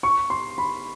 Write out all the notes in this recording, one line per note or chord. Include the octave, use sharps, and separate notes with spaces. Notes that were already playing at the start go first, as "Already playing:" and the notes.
C#6
C6
B5